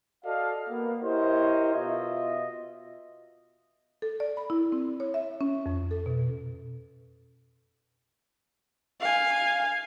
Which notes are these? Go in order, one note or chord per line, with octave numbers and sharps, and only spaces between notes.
F#4 A4 D5 D#5 F5
A#3 B3
E4 G4 A#4 C5 C#5 D#5
B2 F4 D#5 E5
A4
D5
B5
E4
C4
C#5
E5
C#4
F2
A4
B2
F5 G#5